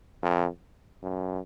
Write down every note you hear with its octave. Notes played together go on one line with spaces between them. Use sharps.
F2
F#2